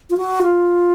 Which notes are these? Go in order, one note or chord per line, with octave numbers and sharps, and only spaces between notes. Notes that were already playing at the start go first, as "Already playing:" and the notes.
F4
F#4
F4